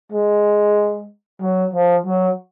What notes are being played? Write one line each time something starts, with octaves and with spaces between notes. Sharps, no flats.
G#3
F#3
F3
F#3